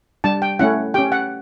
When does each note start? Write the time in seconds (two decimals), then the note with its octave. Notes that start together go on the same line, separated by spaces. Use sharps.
0.24 G3 D4 G4 A5
0.42 G5
0.59 A3 C#4 E4 F#5
0.94 C#4 G4 G5
1.12 F#5